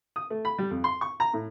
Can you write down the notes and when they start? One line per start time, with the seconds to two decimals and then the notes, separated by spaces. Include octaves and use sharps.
0.16 D#6
0.30 A3
0.45 B5
0.58 G3
0.71 F2
0.84 C6
1.01 C#6
1.20 A#5
1.34 A2